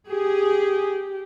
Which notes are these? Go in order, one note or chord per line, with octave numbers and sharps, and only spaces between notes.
G4 G#4